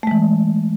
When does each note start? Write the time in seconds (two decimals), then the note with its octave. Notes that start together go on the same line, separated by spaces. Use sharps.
0.03 A3
0.07 G#3
0.11 E3